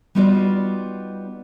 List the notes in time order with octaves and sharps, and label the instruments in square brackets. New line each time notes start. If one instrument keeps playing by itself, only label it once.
[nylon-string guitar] G3 B3 D#4 F4 F#4 D5